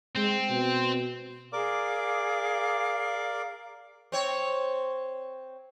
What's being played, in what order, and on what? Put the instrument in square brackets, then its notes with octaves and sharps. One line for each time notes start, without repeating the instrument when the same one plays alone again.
[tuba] G#3 [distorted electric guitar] C4
[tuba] B2
[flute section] G#4 F5 [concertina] A#4 D5 D6
[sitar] C4 C#5